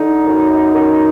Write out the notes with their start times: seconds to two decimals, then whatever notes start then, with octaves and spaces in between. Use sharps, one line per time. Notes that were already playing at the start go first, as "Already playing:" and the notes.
Already playing: D3 D#4
0.27 F#2
0.75 F#2